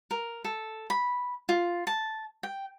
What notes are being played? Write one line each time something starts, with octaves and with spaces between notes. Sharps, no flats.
A#4
A4
B5
F4
A5
G5